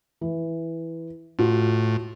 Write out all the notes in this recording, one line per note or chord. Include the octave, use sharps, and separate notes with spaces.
E3
A2 F4 F#4